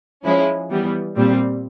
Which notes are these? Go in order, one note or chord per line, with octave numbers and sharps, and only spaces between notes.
F3 G#3 C#4 E4
E3 G3 B3
A#2 G3 C4